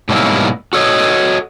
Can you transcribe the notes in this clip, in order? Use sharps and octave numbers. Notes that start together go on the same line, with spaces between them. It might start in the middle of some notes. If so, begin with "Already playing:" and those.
G#2 B2 F#3 G3 A#3 E4
F#4 A4 C#5 D#5